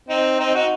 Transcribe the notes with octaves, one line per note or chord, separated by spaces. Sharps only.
C4 D#4
C4 D#4
D#4 F#4